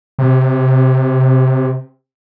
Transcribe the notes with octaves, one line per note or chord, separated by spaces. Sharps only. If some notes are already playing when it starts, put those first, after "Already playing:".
C3